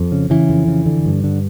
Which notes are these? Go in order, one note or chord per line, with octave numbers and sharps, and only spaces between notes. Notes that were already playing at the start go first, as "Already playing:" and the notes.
Already playing: F2
C#3
C#3 E3
F2
C#3
D3
G2
D3